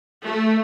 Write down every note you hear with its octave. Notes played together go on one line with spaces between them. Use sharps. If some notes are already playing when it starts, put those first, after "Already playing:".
A3